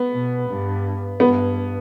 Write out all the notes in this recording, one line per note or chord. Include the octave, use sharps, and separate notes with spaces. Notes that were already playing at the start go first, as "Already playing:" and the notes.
Already playing: B3
B2
G2
G2 B3